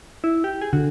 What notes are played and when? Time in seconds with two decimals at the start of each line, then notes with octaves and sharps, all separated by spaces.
0.24 E4
0.44 G4
0.61 G#4
0.73 D3 F#4